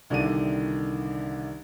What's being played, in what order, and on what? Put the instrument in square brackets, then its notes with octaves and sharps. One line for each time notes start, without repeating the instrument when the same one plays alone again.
[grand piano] C2 D3 D#3 D4 E4 D#7